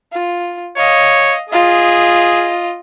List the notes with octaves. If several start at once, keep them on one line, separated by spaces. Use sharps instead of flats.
F4
C#5 D#5 F5
F4 G#4 D#5